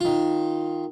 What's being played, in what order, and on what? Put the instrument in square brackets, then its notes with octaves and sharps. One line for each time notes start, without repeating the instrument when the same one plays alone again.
[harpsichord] D#3 F4